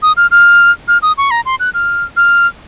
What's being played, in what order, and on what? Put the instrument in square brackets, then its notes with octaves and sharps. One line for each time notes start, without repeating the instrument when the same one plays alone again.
[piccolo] D#6
F6
F6
F6
D#6
C#6
A#5
C6
F#6
F6
F6